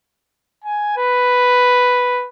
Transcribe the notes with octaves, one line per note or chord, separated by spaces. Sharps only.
G#5
B4